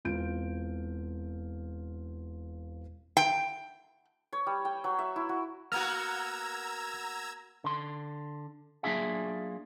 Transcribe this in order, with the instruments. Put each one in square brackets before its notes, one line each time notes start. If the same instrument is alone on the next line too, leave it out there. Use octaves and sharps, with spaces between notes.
[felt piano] E1 C4 F4 G6 D7
[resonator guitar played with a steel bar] G5
[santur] C#5
G3
G5
F#3
E5
E4
F#4
[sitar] A#3 B3 F#4 [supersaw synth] A#5 E6 G#6 [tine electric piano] F6
[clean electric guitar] D3 C6
F#3 A#3 D4 F4 G#4 E5